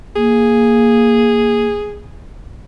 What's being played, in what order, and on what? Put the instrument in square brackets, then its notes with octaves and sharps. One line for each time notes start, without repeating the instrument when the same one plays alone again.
[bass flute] A#3 [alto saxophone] G#4